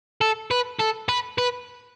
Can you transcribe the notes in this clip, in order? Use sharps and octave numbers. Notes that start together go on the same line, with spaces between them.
A4
B4
A4
B4
B4